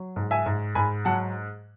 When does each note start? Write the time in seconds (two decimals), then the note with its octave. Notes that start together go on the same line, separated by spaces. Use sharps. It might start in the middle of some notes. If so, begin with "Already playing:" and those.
Already playing: F#3
0.16 G#2
0.31 E5 G#5
0.46 G#2
0.75 G#2 G#5 B5
1.05 F#3 F#5 A5